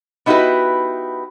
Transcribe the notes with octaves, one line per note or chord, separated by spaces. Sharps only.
B3 D#4 E4 F#4 G4 B4